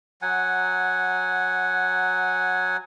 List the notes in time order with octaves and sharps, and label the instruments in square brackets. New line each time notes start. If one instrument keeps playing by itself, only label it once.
[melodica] F#3 F#5 G#5